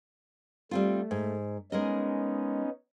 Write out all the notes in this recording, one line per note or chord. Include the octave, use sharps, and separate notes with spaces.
G3 A3 C4 F4
G#2
G#3 B3 C#4 D#4 A#4 D#5